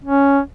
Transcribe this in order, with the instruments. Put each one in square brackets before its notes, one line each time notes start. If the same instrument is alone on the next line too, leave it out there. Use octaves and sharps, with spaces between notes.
[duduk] C#4